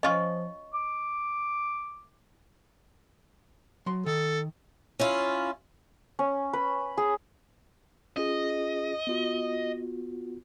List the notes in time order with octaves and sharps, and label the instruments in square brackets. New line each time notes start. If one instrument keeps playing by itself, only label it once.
[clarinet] F3 [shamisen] C#4 F4 [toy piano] D#5 C#6
[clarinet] D6
[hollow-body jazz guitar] F#3 C6
[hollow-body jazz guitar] D#3 [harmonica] A4
[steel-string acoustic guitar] C#4 E4 F4
[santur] C#4
B4
G#4
[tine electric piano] C#4 F4 G#4 [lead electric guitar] D#5
[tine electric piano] B3 F4 F#4